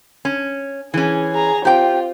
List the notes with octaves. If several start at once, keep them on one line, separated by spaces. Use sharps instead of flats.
C#4
E3 C#4 G#4
G#4 A#5
C4 F4 G4 G5